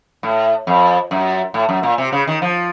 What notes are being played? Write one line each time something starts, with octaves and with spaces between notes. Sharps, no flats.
A2
F2
F#2
A2
F#2
A#2
C3
C#3
D#3
F3